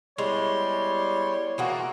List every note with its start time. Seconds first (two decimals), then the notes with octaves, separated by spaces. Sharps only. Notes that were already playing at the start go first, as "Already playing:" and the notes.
0.18 G3 G#3 B3 E4 C#5 C6
1.58 E3 A#3 F4 F#4 G#4